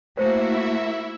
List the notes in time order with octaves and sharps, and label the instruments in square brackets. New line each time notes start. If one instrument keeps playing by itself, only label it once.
[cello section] A3 A#3 F#4 [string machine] E4 E5 [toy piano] C5 C#5